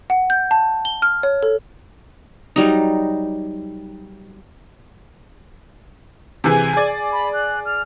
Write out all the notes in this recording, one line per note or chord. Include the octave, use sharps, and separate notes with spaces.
F#5
G6
A5
G7
F6
C#5
A4
F#3 G3 D#4
C3 E3 G#4 G#5
G#4 D5
B5
F#6
F6